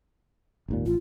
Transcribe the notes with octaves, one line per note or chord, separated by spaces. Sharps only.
G#1 D#2 A#2
A1 F4